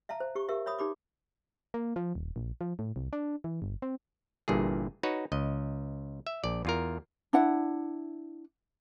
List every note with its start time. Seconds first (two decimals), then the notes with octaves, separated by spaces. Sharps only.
0.09 E5 F5 A5 A#5
0.20 C5
0.35 G4 C#6
0.48 G4 A#4 E5 F5
0.66 C#5 E5 B5 D#6
0.79 D#4 G4 B5 D6
1.74 A#3
1.96 F3
2.15 D#1
2.36 A#1
2.61 F3
2.79 A2
2.96 C2
3.13 D4
3.44 E3
3.62 G1
3.82 C4
4.48 G1 G2 A#2 E3 G#4
5.03 D#4 F#4 B4 C#5
5.32 C#2 D#5
6.27 E5
6.44 A#1 D5
6.65 E2 F4 A#4
7.33 D4 E4 F#5